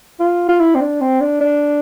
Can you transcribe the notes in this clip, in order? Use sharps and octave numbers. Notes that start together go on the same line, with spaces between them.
F4
F4
E4
C4
D4
C4
D4
D4